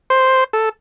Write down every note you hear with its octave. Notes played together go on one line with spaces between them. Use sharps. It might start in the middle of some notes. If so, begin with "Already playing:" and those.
C5
A4